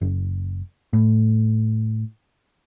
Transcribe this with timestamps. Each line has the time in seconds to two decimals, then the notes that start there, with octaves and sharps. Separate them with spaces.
0.01 F#1
0.93 A2